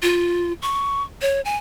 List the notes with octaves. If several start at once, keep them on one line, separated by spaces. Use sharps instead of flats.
F4
C#6
C#5
G#5